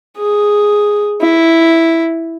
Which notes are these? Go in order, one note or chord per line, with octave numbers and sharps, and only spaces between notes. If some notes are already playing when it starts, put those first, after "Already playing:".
G#4
E4